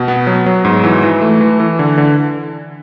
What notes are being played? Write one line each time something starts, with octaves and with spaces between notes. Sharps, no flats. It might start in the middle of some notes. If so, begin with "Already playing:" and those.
Already playing: B2
B3
F#3
F#3
G#2
E3
E3
A3
E3
E3
D3
D3